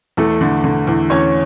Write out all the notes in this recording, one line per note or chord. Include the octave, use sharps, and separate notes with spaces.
E2 A3 A4
D3
D3
E2
E2 C#4 C#5